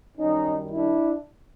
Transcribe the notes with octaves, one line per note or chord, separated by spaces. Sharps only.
F#2 D#3 G3 C#4 D#4
D4 E4